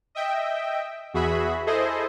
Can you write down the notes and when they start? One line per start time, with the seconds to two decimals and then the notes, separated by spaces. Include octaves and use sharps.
0.15 D#5 E5 G5
1.14 E2 F#4 G#4 E5 B5
1.67 E4 G#4 A4 C5 D#5